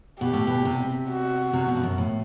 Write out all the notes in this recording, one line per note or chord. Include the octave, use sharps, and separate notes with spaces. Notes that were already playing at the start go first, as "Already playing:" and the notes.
B2 G4
A2
B2
C3
F#4
C3
B2
G2
F#2
A2